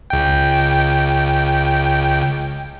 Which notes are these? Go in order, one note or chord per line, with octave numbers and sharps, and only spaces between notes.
C#2 G5